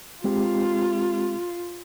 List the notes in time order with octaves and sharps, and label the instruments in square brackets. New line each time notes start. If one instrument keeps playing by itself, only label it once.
[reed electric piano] G#3 C4 G4 [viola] F4